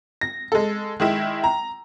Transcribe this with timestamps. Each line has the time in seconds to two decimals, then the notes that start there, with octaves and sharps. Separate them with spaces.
0.21 A#6
0.52 G#3 A4
1.00 D#3 G#3 E4
1.44 A#5